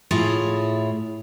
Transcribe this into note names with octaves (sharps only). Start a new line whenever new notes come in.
A2 E4 F4 G#4 C#5